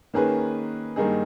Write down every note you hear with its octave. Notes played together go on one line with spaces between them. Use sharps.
D#3 A#3 C#4 G#4 B4
G2 D#3 A#3 D#4 G#4